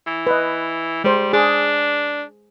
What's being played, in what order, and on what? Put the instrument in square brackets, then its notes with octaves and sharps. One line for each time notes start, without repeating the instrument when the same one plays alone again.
[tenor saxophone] E3
[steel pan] B4 D#5
[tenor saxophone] G3 [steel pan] G#3 C5
[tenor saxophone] D4 [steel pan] G#4